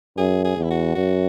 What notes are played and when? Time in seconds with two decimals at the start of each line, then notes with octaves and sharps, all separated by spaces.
0.18 F#2 G#4
0.45 G#4
0.57 E2
0.63 E4
0.71 F#4
0.95 F#2 F#4